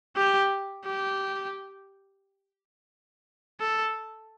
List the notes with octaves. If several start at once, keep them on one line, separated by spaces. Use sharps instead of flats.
G4
G4
A4